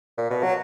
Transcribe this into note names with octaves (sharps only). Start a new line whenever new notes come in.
A#2
B2
F#3